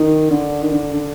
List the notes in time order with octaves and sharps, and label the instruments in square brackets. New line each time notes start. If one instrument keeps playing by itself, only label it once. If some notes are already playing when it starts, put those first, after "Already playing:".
Already playing: [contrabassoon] D#3
D3
D#3
D3
D3